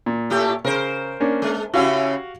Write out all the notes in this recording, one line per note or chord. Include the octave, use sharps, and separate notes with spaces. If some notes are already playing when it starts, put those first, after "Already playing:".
A#2
A2 A3 G4
C#3 A#4 C5
A#3 C#4 D4
G#3
C#3 C#4 E4 F#4 G4 F5